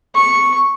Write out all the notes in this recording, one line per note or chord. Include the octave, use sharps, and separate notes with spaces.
C#6